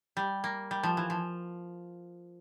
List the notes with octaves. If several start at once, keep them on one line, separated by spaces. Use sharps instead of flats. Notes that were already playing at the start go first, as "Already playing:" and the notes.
G3
A#3
G3
F3
E3
F3